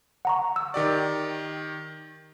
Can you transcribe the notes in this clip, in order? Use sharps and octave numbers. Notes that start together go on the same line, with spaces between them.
F#5 A#5 C#6
E6
D#3 G4 D5